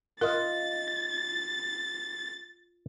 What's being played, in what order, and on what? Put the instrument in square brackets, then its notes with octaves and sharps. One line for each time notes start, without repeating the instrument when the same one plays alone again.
[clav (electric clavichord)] F4 D#5 F5 [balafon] A#4 [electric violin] A6